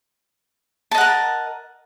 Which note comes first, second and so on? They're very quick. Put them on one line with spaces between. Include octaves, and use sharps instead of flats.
A5 D#5 F#5 A#4